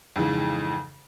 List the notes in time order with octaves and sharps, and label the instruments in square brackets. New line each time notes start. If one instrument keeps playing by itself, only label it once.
[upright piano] F2 G#2 C#3 E3